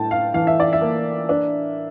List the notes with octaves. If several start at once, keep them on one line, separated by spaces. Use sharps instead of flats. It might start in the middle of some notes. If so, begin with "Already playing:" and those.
Already playing: A2 G5 A5
F5
E3 F5
E5
D5
E5
A#3
D4